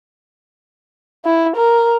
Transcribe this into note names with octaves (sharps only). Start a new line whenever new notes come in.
E4
A#4